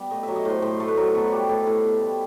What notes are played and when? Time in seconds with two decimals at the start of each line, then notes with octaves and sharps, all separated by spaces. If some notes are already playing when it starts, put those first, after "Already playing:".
Already playing: G3 B3
0.11 A3 D#5
0.23 F#3 E5
0.36 D#5
0.45 A2 C5
0.62 A2 C5
0.80 A3
0.88 B4
0.97 F#3
1.15 B3 A4
1.32 G3 G4
1.49 A2 A4
1.67 A2
1.84 B3
2.01 G3